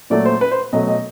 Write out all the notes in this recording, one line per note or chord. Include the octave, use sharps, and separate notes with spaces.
A#2 F#3 A3 D5
C5
B4
C5
B2 F#3 A3 D#5
D#5